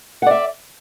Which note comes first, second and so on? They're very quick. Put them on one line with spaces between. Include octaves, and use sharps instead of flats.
F#5 D5 E5